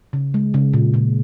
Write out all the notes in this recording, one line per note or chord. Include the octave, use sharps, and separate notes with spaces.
C#3
G#3
C#3
A#2
A#2